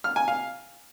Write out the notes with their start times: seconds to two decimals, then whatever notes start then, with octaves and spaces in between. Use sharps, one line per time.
0.04 F6
0.16 G#5
0.28 F5